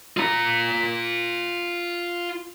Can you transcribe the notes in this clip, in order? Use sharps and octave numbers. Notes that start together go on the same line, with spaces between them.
F4 A#5